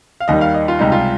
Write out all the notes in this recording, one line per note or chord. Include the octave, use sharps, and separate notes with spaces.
F5
D#2 D#3 G3 D#5
F5
D#5
F4
C#2 C3 G3 D#4
F4